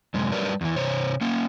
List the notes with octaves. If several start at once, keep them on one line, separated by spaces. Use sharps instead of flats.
F#2 C3 G#3
F#3 G3 G4 A#4 B4 D5
E2 E3
C3 C5 C#5
A#3 C#4